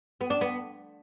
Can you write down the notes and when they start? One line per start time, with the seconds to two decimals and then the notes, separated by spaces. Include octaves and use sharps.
0.21 B3
0.30 D4
0.41 B3